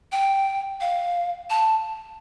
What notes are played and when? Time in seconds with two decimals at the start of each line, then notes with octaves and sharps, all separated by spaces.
0.12 G5
0.81 F5
1.50 A5